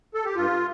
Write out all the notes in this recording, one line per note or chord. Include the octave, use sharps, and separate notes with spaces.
A4
G4
G2 F4